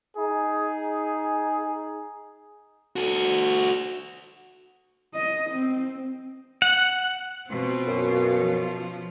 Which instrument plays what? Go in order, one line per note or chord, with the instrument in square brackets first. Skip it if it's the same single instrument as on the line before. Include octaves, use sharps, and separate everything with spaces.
[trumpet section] D#4 G#4
[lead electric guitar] F#4 A4
[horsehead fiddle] D#5
C4
[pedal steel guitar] F#5
[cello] B2 F4 [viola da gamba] C4
[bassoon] F#2
[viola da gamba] F3